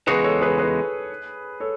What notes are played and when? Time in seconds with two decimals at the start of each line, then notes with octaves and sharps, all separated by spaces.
0.07 E2 C#3 G#3 D#4 F#4 G#4 B4
0.24 A4 C#5
0.42 G#4 B4
0.58 G#4 B4
1.60 A4 C#5